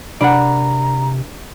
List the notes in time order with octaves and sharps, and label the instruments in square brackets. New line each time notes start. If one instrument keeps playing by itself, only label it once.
[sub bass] C3 [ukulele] D4 A#4 B5 [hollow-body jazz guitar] D5 F#5 [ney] A#5